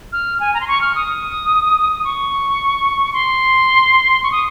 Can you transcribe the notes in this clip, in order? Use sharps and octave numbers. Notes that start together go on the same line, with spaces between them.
F6
G#5
A#5
C6
C#6
F6
D#6
D#6
C#6
C6
C#6
D#6